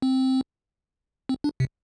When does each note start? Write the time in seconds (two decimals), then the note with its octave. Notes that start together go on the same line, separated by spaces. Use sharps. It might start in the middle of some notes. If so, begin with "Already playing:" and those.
0.02 C4
1.29 C4
1.44 D4
1.60 C3